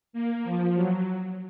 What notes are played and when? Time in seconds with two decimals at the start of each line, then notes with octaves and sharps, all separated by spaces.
0.13 A#3
0.44 F3
0.75 F#3